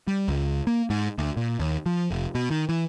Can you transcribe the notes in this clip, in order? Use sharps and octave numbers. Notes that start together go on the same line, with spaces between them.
G3
C#2
A#3
G#2
D2
A#2
D#2
F3
F1
B2
D#3
E3